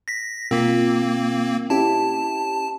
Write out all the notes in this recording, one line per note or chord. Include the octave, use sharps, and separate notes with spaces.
A#6 B6
B2 A#3 C4 F4 A#4
C#4 E4 G4 A5